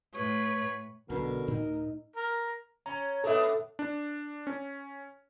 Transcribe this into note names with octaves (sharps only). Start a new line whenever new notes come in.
A2 B4 C#5
B1 B2 D3 C#4 A#4
D2 A2 D#4
A#4
C#4 A#5
B3 D4 D#4 A4 E5
D4
C#4